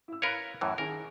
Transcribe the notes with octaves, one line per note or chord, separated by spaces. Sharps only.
E4 E6
A#4 B4 C#5 F5 B5 F#6
F#2 A2 E3
D#3 G#4 A#4